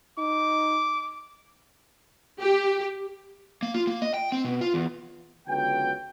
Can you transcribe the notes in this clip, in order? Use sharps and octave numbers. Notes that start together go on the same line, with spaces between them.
D#4 D6
G4
A#3
F4
A#3
D#5
G5
C4
B2
F4
E2
C#2 D3 F#3 B3 G5